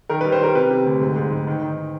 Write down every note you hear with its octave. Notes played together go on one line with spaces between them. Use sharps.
D#3 A#4
B4
G3
C5
G3 A#4
C3 B4
C3
D2
G#2
G#2
G#2
D#3
D#3